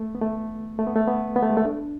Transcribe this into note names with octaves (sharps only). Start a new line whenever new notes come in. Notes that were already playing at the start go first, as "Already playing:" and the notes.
Already playing: A3
B3
A3
A3
B3
A3
B3
B3
A3
G#3
A3
D4